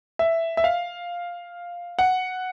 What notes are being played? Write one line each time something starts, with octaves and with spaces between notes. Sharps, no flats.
E5
E5
F5
F#5